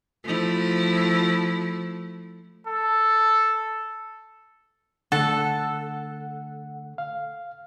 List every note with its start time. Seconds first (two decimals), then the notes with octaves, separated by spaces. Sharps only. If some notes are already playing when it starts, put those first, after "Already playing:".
0.24 F3 A3 E4
2.67 A4
5.12 D3 A3 A4 F#5
6.98 F5